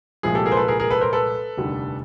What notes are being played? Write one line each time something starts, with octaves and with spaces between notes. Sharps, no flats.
C2 A#2 F3 G#3 G#4
G4 A4
G#4 A#4
C5
A4 B4
G#4 A#4
G#4 A#4
A4 B4
A#4 C5
A4 B4
F1 D#2 D3 G3